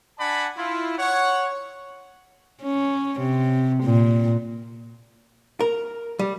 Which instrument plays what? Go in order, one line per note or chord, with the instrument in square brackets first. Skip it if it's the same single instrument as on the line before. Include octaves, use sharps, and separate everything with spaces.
[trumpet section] D4 D5 F#5 G#5 A5 B5
E4 F4
C#5 F#5
[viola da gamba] C#4
C3
A#2
[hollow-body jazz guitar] A#4
G3